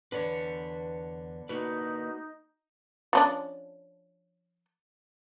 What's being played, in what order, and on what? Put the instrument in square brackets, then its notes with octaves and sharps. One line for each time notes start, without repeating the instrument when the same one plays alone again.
[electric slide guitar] E2 B4 [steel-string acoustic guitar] D3 C#5
[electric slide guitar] A#3 F#4 B4 [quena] D#4
[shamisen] F3 C#4 D4